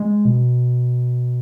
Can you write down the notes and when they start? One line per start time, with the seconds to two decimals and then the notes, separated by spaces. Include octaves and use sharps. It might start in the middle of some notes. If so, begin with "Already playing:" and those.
Already playing: G#3
0.25 B2